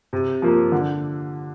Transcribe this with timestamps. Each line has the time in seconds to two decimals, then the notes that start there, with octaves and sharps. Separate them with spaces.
0.13 C3
0.42 F3 A#3
0.72 D3